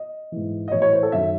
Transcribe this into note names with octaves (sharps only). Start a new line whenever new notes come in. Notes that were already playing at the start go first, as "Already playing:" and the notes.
Already playing: D#5
G#2 E3
D#5
A2 E3 C#5
C#5
C5
A4
F#2 D#3 F#3 E5